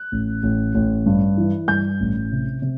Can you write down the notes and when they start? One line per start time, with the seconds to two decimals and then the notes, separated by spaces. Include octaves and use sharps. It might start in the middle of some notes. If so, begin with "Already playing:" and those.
Already playing: F#6
0.12 A1
0.43 A1
0.74 A1
1.06 G2
1.38 E3
1.68 G2 G6
2.00 A1
2.32 C3
2.62 C3